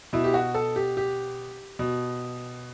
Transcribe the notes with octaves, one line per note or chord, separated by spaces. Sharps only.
B2 E4
G4
F#4
A4
G4
G4
B2